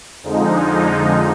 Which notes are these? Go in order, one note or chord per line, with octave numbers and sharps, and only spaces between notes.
F2 D3 F3 G#3 D#4